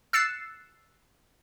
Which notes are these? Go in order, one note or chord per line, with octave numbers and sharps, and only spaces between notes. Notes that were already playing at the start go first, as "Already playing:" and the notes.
E6 F#6 A6 C7 C#7 E7